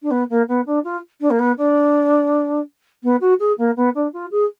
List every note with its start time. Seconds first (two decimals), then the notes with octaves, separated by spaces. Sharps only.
0.02 D4
0.10 B3
0.29 A#3
0.48 B3
0.66 D4
0.84 F4
1.20 D4
1.30 A#3
1.39 B3
1.57 D4
3.03 B3
3.20 F#4
3.39 G#4
3.58 A#3
3.76 B3
3.94 D4
4.13 F4
4.31 G#4